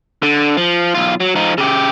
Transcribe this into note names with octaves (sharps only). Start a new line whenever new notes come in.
D3
F3
B1 F4
F#3
F3 D#4
C#3 G4